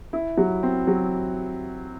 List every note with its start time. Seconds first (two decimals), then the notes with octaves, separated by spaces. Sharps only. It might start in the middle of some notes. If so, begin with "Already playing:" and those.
0.13 E4
0.37 F#3
0.63 C4
0.87 F#3